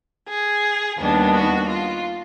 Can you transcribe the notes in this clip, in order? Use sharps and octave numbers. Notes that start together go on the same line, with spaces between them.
G#4
D#2 D#3 G3 B3 D4
F#4
F4